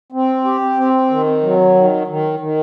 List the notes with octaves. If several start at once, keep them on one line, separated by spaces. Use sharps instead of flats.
C4
G4
C4
D#3
F#3
D#3
D#3
D#3